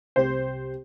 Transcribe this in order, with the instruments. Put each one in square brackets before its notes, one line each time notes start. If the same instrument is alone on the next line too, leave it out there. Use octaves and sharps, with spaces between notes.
[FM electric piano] C2 C3 G4 [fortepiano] C5